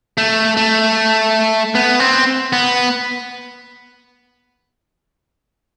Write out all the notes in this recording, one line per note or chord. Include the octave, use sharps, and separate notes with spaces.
A3
A3
B3
C4
B3